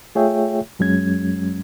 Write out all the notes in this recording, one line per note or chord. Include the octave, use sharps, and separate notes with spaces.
A3 F4 G#4 C#5 E5 G5
F#2 F#3 G#3 C#4 G#6